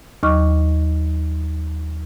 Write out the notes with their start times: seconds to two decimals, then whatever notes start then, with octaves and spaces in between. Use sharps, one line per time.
0.23 D#2 F#3 D#5 C#6 D6 F6